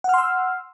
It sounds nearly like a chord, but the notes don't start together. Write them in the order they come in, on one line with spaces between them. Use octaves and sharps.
F#5 F6 C6 E6